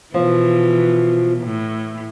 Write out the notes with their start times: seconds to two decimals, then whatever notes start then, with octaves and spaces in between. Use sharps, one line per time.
0.14 B2 E3 F3
1.43 A2